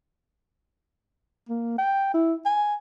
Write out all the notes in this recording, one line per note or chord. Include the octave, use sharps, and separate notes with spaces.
A#3
G5
E4
G#5